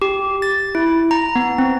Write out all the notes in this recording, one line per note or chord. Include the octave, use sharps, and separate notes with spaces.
G4
A6
E4
A#5
B3
C4